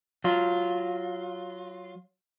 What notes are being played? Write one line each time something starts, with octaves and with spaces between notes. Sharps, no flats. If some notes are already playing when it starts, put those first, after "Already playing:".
F#3 F4